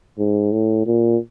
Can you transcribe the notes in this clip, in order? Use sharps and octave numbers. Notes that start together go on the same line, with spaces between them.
G#2
A2
A#2